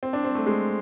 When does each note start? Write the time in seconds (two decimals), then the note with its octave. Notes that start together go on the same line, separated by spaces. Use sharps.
0.03 C4
0.13 D4
0.24 C4
0.35 A3
0.46 G#3